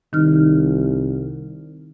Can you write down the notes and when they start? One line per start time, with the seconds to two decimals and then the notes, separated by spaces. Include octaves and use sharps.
0.13 C2 D#3 D#4 F6